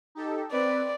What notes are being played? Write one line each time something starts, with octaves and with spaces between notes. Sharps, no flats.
D#4 G4 A4
C4 B4 D5